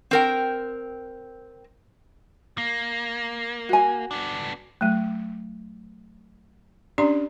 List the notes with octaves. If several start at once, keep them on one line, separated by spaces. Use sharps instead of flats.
C4 A#4 G5
A#3
F#4 G#5
B3 D4
F#3 A3
C#4 D4 G4 D5 A#5